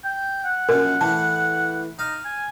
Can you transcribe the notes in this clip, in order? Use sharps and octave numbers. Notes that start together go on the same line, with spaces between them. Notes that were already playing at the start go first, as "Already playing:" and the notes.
G5
F#5
A#1 F#2 A#4
A2 E3 A5
D#4 F5
G#5